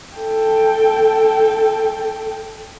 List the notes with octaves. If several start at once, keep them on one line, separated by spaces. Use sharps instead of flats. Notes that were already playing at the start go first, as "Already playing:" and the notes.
A4 G5